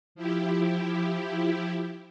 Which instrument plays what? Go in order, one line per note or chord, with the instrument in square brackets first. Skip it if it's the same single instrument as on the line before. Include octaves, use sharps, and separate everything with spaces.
[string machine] F3 E4 G4